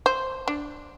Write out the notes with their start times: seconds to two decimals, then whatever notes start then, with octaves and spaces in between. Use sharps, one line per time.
0.06 C5
0.48 D4